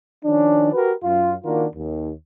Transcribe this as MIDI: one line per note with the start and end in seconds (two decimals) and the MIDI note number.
0.25 0.68 51
0.25 0.68 53
0.25 0.68 61
0.25 0.68 62
0.72 0.91 66
0.72 0.91 67
0.72 0.91 70
0.72 0.91 71
1.03 1.33 42
1.03 1.33 65
1.44 1.65 51
1.44 1.65 58
1.44 1.65 62
1.44 1.65 65
1.44 1.65 66
1.44 1.65 70
1.74 2.10 39